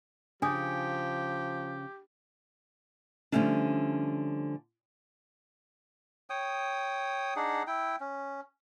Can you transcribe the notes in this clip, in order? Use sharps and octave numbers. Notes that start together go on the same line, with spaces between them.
C#3 F3 D4 G4 G#5 D#6
D3 F3 G3 A3 C#4 D4
C#5 G5 D#6
D4 D#4 G#4 F#5
E4 G5
C#4